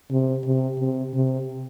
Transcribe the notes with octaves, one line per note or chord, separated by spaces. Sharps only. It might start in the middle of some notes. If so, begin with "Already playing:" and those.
C3
C3
C3
C3